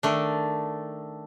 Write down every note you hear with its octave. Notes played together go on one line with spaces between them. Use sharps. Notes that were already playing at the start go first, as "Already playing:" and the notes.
D#3 A3 D4